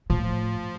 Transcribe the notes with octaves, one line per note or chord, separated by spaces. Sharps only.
A2 F3